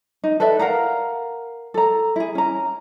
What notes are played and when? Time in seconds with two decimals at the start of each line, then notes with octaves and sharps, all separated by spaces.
0.24 D#4
0.40 A4 B4 D5 E5
0.59 A#4 F5 F#5 A#5
1.74 A4 A#5
2.16 E4 G#4
2.35 C#4 A#5